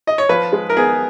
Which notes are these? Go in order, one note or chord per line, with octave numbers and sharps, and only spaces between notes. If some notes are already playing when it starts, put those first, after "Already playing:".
D#5
C#5
F3 B4
G#3
A#4
B3 G#4